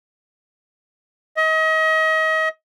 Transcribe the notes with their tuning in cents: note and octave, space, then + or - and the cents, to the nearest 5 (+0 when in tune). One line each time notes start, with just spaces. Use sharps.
D#5 +35